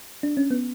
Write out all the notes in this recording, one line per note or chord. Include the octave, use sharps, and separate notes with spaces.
D4
C#4
B3